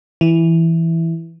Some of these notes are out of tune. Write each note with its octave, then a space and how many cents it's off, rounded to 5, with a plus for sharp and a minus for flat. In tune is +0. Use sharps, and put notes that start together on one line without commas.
E3 +0